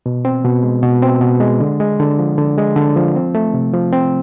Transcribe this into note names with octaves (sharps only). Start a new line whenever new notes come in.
B2
C4
B2
G#3
B2
C4
B2
G#3
D3
G#3
D3
F3
D3
G#3
D3
F3
C4
A3
C3
F3
C4